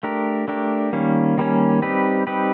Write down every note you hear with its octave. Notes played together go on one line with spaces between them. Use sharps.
A3 D4 G4 A#4
A3 D4 G4 A#4
D#3 G3 A#3 C#4
D#3 G3 A#3 C#4
G3 C4 D#4 G4 B4
G3 C4 D#4 G4 B4